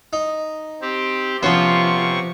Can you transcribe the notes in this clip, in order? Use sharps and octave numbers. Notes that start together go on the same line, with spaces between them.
D#4
C4 G4
C3 F3 B3 C#4 F4 C5 C#6